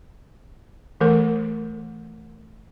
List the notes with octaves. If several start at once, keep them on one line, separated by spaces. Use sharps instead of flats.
E3 A3 A4 A#4